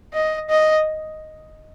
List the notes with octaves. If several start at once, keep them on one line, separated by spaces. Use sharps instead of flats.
D#5
D#5